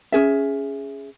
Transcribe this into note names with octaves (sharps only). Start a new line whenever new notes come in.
C#4 G#4 E5